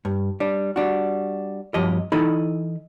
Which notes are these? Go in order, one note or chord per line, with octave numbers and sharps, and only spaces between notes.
G2
G3 D4
G3 D4 F#4
G2 F3 F#3 G4 D#5
E3 D#4 E4 A4 D#5 B5